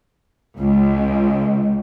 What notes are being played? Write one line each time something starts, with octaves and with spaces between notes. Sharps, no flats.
C#2